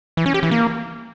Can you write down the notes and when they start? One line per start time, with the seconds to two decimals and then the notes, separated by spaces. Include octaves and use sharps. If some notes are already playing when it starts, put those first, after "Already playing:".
0.17 E3
0.26 C#4
0.34 G4
0.43 E3
0.51 A#3